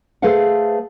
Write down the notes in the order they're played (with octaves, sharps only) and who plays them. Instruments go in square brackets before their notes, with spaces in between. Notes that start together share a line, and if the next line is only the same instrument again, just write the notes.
[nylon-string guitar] A3 G#4 B4 C5 F5 F#5